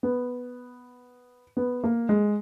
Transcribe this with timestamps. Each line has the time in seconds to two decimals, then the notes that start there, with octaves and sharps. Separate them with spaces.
0.03 B3
1.57 B3
1.84 A#3
2.09 G#3